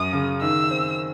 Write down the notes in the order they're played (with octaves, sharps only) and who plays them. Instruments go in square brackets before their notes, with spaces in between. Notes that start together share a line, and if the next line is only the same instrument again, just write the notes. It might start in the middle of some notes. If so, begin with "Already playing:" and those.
Already playing: [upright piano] F#2 [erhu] D#6
[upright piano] C#3
[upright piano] D#3 [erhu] E6
[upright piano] C4